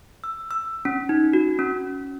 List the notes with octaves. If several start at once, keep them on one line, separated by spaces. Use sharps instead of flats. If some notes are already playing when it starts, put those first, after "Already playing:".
E6
E6
C#4
D#4
F#4
C#4